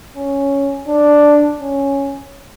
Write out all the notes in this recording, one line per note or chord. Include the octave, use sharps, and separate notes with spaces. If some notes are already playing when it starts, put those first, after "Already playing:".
C#4
D4
C#4